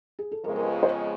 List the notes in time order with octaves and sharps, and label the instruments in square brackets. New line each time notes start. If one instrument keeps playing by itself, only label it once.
[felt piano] G#4
A4
[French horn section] F2 C#3 F3 G#3 B3 [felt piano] A#4
[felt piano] A#4
B4
C5